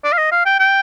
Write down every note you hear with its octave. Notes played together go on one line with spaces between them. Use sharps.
D5
F5
D#5
F5
G5
G5